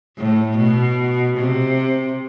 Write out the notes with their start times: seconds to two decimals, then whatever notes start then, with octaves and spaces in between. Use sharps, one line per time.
0.18 A2
0.58 B2
1.38 C3